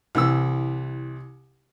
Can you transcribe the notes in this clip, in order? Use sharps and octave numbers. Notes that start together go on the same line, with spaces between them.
C2 E3 E6